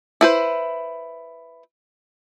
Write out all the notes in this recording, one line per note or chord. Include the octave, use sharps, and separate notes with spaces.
E4 B4 C5